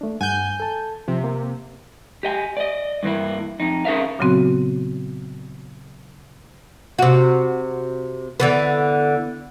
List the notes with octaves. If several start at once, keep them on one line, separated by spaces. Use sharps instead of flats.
A3 D4
G2 F#5 G#5 G6
A4 A5
C3 F3
A#3
G4 D#5 G5 G#5
D5 D#5
G2 E3 A#3 E4
F2 D#4
C#4 G#4 A#4 E5 F5
A#2 C#3 F#3 B3 C4 F#4
C3 F#4
D3 E3 B3